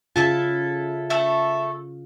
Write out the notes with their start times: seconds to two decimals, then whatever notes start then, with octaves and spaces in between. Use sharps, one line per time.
0.16 C#3 E4 F4 A4 A5
1.10 A3 A4 E5